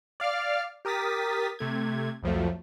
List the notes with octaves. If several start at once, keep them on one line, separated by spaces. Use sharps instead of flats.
D5 F5 D6 F6
G4 A#4 D#6 A6 B6
C3 A3 G#6
C2 F2 F3 F#3 A3